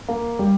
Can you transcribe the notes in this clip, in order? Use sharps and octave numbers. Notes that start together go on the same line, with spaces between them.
A#3
G3